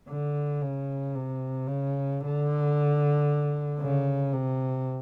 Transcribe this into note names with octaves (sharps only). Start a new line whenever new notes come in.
D3
C#3
C3
C#3
D3
C#3
C3